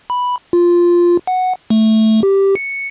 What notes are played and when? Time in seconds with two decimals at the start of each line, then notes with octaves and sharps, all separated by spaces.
0.10 B5
0.53 F4
1.27 F#5
1.70 A3
2.23 G4
2.56 C#7